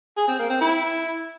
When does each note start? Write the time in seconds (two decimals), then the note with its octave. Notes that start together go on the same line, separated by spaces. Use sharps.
0.17 G#4
0.28 C4
0.39 A#3
0.50 C4
0.61 E4